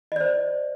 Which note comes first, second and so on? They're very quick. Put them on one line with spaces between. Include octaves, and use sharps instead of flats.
D#5 D5 C5